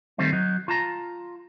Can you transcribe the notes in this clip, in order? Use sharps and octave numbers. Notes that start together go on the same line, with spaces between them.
D#3 G3 A3 C4 D#4
F#3 D#4
F4 A5 A#5